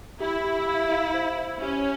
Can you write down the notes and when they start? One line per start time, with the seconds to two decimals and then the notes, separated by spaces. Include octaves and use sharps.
0.20 E4 G4
0.44 G4
0.68 F5
0.91 F5
1.14 C5
1.39 C5
1.61 C#4 G4